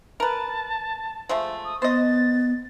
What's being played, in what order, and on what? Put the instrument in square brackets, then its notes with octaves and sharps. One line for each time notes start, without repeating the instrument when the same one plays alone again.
[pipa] A#4 B4 [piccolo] A5
[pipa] F3 G#3 A3
[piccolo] D#6
[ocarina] B3 [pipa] C5 D#5 [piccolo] A6